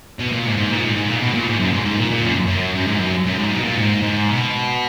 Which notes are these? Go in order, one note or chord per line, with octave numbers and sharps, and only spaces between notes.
B2
A#2
G#2
G#2
A#2
G#2
G#2
A#2
B2
A#2
G#2
F#2
G#2
G#2
A#2
A#2
F#2
F#2
F#2
G#2
F#2
F#2
G#2
B2
A#2
G#2
G#2
B2